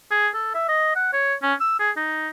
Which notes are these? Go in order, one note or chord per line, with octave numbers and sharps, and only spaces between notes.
G#4
A4
E5
D#5
F#5
C#5
C#4
E6
G#4
D#4